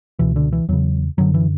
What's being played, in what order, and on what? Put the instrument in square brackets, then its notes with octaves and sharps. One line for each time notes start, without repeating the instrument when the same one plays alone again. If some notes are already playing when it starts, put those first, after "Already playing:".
[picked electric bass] C#2 B2 E3
D3
E3
E2 C#3 F#3
F#2 D3 F#3
E3